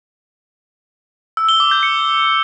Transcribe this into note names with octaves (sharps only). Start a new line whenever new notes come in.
E6
G7
D6
G6
C#7